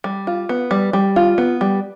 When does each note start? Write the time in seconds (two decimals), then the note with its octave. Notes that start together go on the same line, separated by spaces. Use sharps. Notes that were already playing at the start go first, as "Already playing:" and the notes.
0.04 G3
0.27 F4
0.49 B3
0.71 G3
0.93 G3
1.16 F4
1.38 B3
1.61 G3